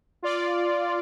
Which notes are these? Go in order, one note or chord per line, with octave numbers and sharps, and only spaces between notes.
F4 D5